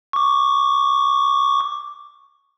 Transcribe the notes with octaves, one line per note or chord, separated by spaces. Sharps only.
C#6 D6